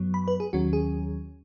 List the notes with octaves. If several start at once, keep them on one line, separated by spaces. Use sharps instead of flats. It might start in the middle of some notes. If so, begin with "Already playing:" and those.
Already playing: F#2 F#3 B3
B5
B4
G#4
D#2 D#3 F#3 C#4 F#4
G#4